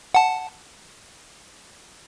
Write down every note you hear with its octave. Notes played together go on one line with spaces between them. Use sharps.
F#5 A5